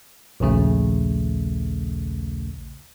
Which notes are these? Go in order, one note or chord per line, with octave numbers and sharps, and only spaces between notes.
A#1 D#2 C#3 A3